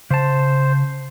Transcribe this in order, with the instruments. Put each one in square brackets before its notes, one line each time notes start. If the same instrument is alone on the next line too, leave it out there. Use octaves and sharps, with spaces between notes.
[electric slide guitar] C#3 A5 [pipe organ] C5